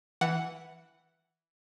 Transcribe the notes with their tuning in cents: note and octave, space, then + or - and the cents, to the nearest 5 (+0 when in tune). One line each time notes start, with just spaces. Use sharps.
E3 +0 F#5 +0